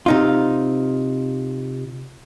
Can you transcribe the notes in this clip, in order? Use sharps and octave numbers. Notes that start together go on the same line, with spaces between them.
C3 D#4 F4